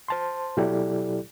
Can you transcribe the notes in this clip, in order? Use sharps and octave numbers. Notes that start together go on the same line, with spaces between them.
C5 A5 C6
B2 F#3 E4 G4 A4 D5